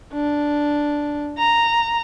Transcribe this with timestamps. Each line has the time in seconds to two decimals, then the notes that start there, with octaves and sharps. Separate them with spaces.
0.14 D4
1.38 A#5